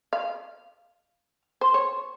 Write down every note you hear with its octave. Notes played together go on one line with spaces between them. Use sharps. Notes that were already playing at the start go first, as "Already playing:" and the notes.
F5
C5
C#5